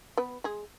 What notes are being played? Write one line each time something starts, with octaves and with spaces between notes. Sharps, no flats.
B3 B4
G#3 G#4